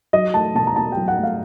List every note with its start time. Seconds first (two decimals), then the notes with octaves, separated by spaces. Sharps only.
0.13 F#3 D#5
0.34 A3 A5
0.55 B2 A5
0.67 A#5
0.76 B2 A5
0.92 F#3 G5
1.08 F#5
1.18 A3
1.23 F5